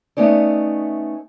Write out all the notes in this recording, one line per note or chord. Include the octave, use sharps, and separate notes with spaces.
A3 B3 C#4 D#4 D5